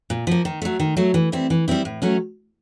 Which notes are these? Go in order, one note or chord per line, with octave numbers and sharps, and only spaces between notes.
A#2
F3 A#3
D#3
F#3 A3
D#3
F#3 A3
E3
G3 C4 E4
E3
G3 C4 E4
A2
F#3 A3 C#4